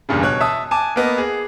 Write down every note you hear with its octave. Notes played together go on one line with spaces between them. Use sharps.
E2 G2 A#2 C#3
B2 C#5 F#6
E5 A5 D#6 E6
G#5 A5 D6
A#3 B3 D#5
G#4